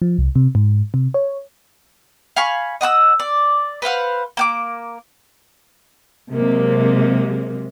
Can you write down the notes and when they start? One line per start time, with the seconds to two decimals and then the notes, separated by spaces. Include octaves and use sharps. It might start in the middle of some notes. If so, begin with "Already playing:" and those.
0.02 F3
0.18 C2
0.35 C3
0.55 G#2
0.94 C3
1.14 C#5
2.36 F5 G#5 B5 C#6
2.81 D#5 F#5 C#6 E6
3.20 D5
3.82 B4 C5 F5 F#5
4.37 A#3 G5 D6
6.34 C3 F#3 G#3 A#3